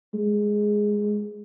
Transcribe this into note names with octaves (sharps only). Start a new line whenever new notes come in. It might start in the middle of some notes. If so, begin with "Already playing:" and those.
G#3